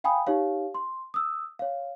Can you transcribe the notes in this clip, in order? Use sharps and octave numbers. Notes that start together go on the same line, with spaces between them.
F5 G5 G#5 B5 D#6
D#4 G4 C#5 F5
C6
D#6 E6
C#5 F5